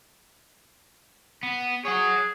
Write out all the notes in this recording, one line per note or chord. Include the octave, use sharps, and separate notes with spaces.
B3
G#4 C#5 F#5